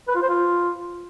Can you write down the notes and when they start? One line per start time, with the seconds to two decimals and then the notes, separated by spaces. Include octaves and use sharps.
0.08 B4
0.15 F4
0.22 C5
0.29 F4